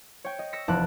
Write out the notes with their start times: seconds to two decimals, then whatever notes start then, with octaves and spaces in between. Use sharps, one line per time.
0.25 C#5 G5
0.39 D#5
0.53 E6 A#6 B6 C#7
0.68 F1 E2 E4 A5 D6 F#6